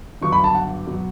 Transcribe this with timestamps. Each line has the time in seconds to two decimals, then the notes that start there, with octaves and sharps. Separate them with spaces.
0.22 G1 G2 F#3 C#6
0.32 B5
0.44 A5
0.55 F#5
0.87 B2 F#3